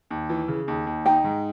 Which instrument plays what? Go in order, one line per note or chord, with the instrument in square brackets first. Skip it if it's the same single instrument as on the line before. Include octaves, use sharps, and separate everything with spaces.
[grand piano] D#2
E3
C#3
D#2
D#2
[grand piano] D#4 [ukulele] G5
[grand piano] G#2